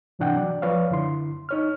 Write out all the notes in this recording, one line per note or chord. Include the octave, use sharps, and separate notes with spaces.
G#2 C3 E3 D4 F#5 G5
F#3 D5
F3 B4 C#5 D5 F5
F#2 D3 E4 C6
D#4 C#5 F6